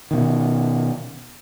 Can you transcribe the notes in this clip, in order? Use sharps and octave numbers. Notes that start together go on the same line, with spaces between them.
B2 D#3